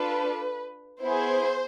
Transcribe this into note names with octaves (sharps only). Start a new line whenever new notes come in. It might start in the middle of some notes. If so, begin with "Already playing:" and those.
Already playing: D4 F4 A4 B4
B3 E4 G#4 C5